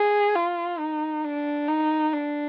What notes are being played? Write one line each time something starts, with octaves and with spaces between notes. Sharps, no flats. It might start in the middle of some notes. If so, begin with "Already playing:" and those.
Already playing: G#4
F4
D#4
D4
D#4
D4